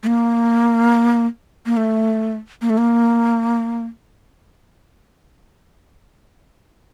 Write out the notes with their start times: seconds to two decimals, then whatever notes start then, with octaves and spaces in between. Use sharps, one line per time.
0.03 A3
0.07 A#3
1.66 A#3
1.77 A3
2.62 A#3
2.70 A3
2.78 A#3